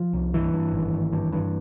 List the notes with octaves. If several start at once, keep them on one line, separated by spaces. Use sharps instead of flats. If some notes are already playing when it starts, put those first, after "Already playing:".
Already playing: F3
C2
G2 E3
G2
G#1
G#1
G2
G2